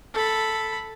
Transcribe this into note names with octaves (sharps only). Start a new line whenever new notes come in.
A4 B5